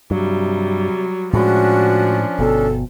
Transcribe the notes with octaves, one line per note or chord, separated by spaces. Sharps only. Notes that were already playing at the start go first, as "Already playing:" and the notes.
G2 C3 F#3 G3
A2 F3 G#3 C#4 D4 F#4
G1 B2 A4